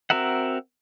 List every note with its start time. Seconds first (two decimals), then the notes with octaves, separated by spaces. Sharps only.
0.10 C4 F#4 A#4 E5 F#5